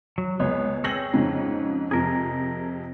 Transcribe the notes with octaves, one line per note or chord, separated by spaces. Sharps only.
F#3
C#2 B3 G#4 C#5
C4 G#4 C#5 E6 A#6 F#7
F2 G#2 C#3
F2 C3 G#4 A#4